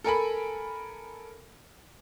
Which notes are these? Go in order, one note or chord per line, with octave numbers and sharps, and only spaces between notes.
A4 A#4 G#5 B5